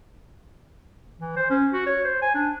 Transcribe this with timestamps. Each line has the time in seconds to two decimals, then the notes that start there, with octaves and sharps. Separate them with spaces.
1.20 E3
1.36 C5
1.50 C#4
1.73 F#4
1.87 C#5
2.05 C5
2.22 G#5
2.35 D4